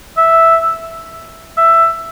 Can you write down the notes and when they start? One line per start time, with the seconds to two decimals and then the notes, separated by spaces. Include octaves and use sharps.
0.17 E5
1.57 E5